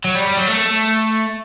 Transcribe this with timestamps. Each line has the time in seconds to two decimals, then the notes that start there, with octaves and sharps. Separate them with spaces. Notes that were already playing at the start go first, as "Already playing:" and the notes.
0.05 F#3
0.15 G3
0.27 G3
0.37 F#3
0.48 A3